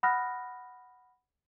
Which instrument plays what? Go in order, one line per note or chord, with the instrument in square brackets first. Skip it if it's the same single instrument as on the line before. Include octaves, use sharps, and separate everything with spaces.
[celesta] F#5 B5 D#6 F6 F#6 A#6